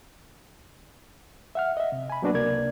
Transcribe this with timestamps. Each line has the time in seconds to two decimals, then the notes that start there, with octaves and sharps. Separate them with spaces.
1.55 E5 F#5 F6
1.77 D#5 E5
1.92 C3
2.10 G#5 B5
2.22 F#3 A#3 B3 D4 F#4 B4
2.34 C#2 C3 A#3 A#4 D5 G#6